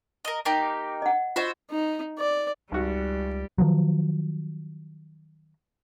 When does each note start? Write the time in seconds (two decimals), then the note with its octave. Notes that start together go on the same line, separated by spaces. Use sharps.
0.25 A#4 D#5
0.45 A#3 D#4 G4
1.02 D#5 F#5
1.36 F4 F#4 C5 D#5 E5
1.71 D#4
2.19 D5
2.72 G#1 C#2 G3 F#4
3.58 D#3 F3 F#3